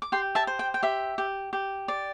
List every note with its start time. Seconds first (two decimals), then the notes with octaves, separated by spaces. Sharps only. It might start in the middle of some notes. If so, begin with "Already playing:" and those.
0.02 D6
0.12 G4 G5 C6
0.35 E5 A5
0.47 C5
0.59 G5
0.74 G5
0.83 G4 E5
1.18 G4
1.53 G4
1.88 D5